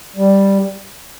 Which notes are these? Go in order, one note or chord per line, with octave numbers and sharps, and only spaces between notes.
G3